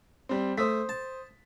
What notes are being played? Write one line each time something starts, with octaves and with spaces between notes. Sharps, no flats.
G3 C4
A3 C5 D#6 B6
A5